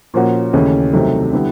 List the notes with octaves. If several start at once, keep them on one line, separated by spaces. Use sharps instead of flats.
A#2 F3 A#3 C#4 F#4
D#2 C#3 E3 A3 C#4
C2 C3 D#3 F#3 A3
D3 G3 B3 E4